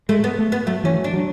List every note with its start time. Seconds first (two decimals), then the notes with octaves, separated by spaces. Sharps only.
0.09 G#3 A3
0.24 B3
0.39 A3
0.52 B3
0.67 F#3 A3
0.84 E3 C#4
0.95 F#3
1.04 D4
1.13 F#3